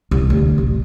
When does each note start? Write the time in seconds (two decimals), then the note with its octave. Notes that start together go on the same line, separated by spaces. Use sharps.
0.11 C2
0.30 D2
0.58 A1